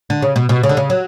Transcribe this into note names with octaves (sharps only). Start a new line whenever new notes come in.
D3
C#3
B2
B2
C#3
D3
C#3
F#3